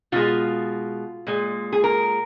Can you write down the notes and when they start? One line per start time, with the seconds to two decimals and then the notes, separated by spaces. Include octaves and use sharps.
0.12 B2 G#3 F4
1.27 A#2 G#3
1.72 G#4
1.84 A#4